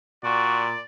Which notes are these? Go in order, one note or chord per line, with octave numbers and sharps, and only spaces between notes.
A#2 F#4 D5